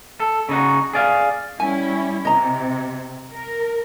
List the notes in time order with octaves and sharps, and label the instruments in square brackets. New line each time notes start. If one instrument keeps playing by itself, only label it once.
[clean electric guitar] A4
C#3 D#4 F#4
G#4 D5 F5
[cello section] G3 C#4 E4 [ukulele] G#5
[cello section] C3 [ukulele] D#5 A#5
[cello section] A#4